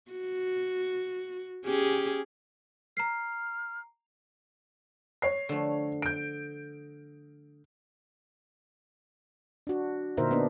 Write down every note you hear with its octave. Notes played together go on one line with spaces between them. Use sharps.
F#4
C#4 G4 G#4
A#5 F6 C7
C#5 C7
D3 F3 A3
G6 D7
D4 F#4
A#2 D3 D#4 A#4 C5 E5
B3 D4